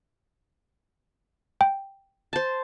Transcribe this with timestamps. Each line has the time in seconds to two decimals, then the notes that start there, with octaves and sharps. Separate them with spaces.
1.61 G5
2.33 C5 A5